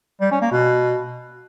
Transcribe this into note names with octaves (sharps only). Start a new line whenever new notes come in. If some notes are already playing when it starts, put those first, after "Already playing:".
G3
C#4
A#3
B2